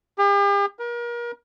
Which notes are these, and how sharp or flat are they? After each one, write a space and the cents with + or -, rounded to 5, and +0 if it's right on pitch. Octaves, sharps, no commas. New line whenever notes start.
G4 +45
A#4 +35